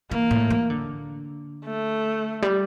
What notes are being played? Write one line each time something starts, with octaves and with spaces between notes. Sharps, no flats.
E3 A#3
A2
E3
D3
A3
G3